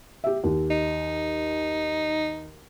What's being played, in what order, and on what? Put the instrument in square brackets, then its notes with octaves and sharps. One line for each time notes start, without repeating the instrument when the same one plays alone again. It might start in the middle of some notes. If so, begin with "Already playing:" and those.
[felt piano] G4 E5
D#2
[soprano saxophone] D#4